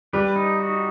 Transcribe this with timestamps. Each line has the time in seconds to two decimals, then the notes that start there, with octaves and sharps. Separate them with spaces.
0.13 G3 G4 B4
0.36 D#4
0.59 F#4